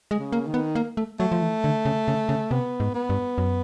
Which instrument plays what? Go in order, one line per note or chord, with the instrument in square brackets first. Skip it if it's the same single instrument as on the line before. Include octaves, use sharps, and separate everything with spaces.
[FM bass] G#3
[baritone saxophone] C#3
[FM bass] A#3
[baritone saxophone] D#3
[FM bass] B3
A#3
A3
[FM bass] F#3 [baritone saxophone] A3
[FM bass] F3
E3
D3
C#3
C#3
C#3
[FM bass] C3 [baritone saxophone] B3
[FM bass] G#2
[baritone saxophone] B3
[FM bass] G2
F#2